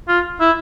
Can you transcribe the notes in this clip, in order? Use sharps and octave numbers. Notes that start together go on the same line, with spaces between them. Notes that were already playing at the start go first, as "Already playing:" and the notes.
F4
E4